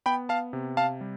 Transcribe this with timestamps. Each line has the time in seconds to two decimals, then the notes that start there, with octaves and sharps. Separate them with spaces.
0.06 B3 G5 B5
0.29 F5 A5
0.53 C3
0.77 F5 A5
1.01 G3